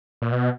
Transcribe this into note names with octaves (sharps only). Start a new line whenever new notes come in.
A#2
B2